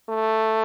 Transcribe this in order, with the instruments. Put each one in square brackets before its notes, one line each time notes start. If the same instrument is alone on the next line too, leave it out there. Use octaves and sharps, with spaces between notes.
[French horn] A3